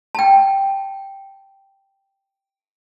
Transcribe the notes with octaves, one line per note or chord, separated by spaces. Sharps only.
G5 A5